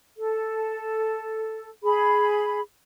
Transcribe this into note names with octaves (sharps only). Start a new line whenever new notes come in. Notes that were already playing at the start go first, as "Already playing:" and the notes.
A4
G#4 B5